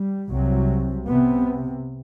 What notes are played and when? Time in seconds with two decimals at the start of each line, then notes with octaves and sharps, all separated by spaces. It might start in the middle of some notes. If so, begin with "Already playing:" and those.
Already playing: G3
0.30 C2 C3 F#3
1.08 C3 B3